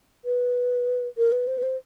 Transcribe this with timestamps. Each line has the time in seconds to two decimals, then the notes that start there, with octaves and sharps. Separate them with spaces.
0.25 B4
1.18 A#4
1.32 B4
1.47 C5
1.58 B4
1.63 C5